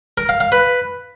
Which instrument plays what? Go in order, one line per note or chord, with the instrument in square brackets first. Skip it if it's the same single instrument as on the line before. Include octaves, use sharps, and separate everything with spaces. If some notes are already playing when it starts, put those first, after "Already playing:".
[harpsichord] A#4
F5
F5
B4